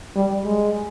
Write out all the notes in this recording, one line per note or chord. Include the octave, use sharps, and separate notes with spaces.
G3
G#3